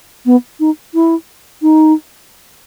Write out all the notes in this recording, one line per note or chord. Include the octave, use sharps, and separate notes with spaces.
B3
D#4
E4
D#4